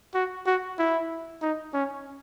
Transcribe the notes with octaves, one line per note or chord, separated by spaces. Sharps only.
F#4
F#4
E4
D#4
C#4